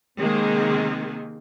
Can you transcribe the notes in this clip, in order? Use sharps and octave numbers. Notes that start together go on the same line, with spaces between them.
C3 D#3 G#3 A#3 C4